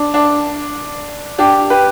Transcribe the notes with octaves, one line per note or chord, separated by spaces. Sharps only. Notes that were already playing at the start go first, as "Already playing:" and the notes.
Already playing: D4
D4
D4 G4
G4 B4